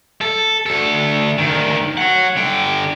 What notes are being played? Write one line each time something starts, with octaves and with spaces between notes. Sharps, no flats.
A4
D2 A4
D2 D#3
C#5 F#5
D3 G5